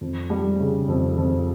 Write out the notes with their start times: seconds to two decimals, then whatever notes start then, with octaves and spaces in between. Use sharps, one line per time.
0.01 F2
0.30 G3
0.60 C#3
0.88 F2
1.17 F2